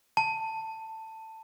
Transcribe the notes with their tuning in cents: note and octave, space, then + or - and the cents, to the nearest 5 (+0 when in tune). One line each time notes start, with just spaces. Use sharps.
A5 +15